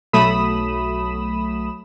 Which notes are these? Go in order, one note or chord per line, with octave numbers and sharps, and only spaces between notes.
B1 F#3 A3 B5 D#6 E7